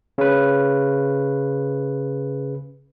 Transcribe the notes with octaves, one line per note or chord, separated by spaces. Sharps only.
C#3 B4